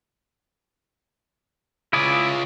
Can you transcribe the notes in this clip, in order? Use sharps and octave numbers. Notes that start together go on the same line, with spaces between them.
C#3 E4 F4 G#4 D5